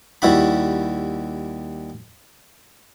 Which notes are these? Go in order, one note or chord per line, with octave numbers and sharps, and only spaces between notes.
D#2 G3 E4 F#4 B5